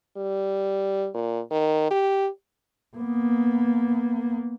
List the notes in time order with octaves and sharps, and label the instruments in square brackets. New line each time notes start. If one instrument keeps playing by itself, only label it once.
[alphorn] G3
A#2
D#3
G4
[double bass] A#3 B3